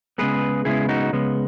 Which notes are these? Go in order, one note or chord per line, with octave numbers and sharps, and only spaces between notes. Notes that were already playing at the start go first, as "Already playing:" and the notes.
C#3 G#3 B3 G#4 B4
C#3 G#3 B3 E4 G#4
D#4 F#4
C#3 G#3 B3